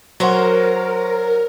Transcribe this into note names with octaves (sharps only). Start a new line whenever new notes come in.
F#3 A#4 C5 C#5 F#5